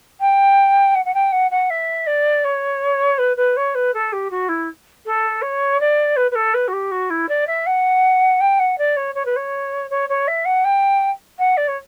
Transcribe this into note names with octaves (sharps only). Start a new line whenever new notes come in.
G5
F#5
F#5
G5
F#5
F#5
E5
D5
C#5
B4
B4
C#5
B4
A4
G4
F#4
E4
A4
C#5
D5
B4
B4
A4
B4
F#4
G4
F#4
E4
D5
E5
F#5
G5
F#5
D5
C#5
C#5
B4
C#5
C#5
C#5
E5
F#5
G5
F#5
D5
C#5